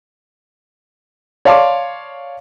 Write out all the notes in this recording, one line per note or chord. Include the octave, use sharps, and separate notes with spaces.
C#5 D5 F5 A5 C6 D6